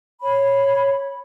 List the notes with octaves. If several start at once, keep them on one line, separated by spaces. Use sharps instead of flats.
C#5 B5